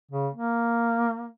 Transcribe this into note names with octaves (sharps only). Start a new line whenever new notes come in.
C#3
A#3